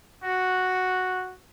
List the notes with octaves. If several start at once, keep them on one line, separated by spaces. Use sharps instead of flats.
F#4